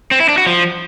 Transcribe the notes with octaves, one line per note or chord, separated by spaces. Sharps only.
C4
E4
D4
F#4
F3